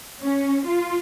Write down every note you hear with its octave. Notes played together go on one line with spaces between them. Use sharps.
C#4
F4